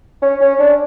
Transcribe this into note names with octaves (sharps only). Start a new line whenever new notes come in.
C#4
C#4
D4